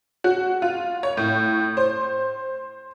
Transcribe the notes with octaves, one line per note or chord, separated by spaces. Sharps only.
F#4
F4
C#5
A2
C5